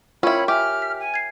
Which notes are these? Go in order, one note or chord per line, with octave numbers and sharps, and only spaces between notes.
C#4 E4 F4 A#4 C#5 G5 B5
G4 E5 G#5 F6
B6
G#5
G#6 C7